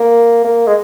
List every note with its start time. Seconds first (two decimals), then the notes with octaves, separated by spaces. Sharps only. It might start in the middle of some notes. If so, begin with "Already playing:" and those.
Already playing: A#3
0.44 A#3
0.67 G#3